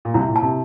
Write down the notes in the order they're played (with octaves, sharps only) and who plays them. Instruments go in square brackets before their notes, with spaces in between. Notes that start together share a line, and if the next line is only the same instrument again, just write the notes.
[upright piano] A#2
[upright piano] C2 C3 [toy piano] E4
[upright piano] A#2
[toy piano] A5
[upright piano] C3